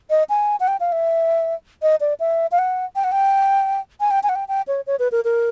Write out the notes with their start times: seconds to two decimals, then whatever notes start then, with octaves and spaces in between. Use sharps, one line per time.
0.10 D#5
0.29 G#5
0.60 F#5
0.68 G5
0.80 F5
0.92 E5
1.82 D#5
2.01 D5
2.20 E5
2.52 F5
2.59 F#5
2.96 G5
3.04 F#5
3.12 G5
4.00 G#5
4.11 G5
4.23 G#5
4.29 F#5
4.36 G5
4.48 G5
4.68 C#5
4.87 C#5
4.99 B4
5.12 A#4
5.25 A#4